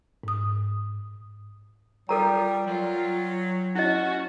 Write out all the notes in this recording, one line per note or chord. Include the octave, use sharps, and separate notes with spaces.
G#2 D#6
G3 F4 A4 A#4 G5 A#5
F#3 F4
C#4 E4 F#4 D#5 F#5